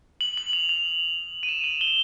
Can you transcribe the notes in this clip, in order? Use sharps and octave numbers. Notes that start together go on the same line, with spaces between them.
F#7
F#7
F7
F7
D#7
E7
F#7
G7